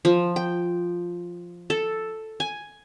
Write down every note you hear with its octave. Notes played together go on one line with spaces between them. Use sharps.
F3
G5
A4
G#5